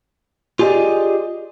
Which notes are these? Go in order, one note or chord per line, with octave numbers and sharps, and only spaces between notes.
F4 G4 G#4 D5 D#5